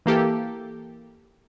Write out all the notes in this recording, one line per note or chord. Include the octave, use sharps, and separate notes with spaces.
E3 A#3 G4 A4